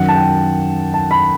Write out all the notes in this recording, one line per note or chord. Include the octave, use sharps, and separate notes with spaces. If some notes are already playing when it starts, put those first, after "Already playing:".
Already playing: F#2 D#3 F#3 F#5
A5
G5
A5
B5